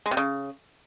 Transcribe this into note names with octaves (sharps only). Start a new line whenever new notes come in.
G#3
C3
C#3